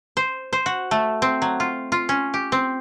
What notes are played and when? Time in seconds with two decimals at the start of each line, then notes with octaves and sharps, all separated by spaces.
0.17 C5
0.53 C5
0.66 F#4
0.91 A3
1.22 C4
1.42 F#3
1.60 F4
1.92 F4
2.09 C#4
2.34 G4
2.52 C4